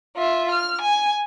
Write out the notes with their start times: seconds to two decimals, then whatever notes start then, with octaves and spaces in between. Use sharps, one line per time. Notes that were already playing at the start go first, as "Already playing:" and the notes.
0.17 F4 E5
0.51 F6
0.81 G#5